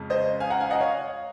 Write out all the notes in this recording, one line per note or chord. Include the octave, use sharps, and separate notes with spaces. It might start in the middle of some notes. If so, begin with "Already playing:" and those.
Already playing: F2 C#3 G#3 C#4
C5 D#5
F5 G#5
F#5 A#5
F5 G#5
D#5 F#5
C#5 F5